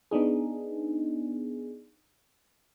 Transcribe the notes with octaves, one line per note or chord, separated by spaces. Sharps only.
B3 D4 D#4 G#4